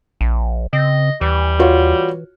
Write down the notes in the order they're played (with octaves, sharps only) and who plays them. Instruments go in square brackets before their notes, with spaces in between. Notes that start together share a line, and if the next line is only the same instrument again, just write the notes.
[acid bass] A#1
[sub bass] C#3 [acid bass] C4 [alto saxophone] D#5
[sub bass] D#2 [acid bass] E3 [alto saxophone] G3
[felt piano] F4 F#4 C#5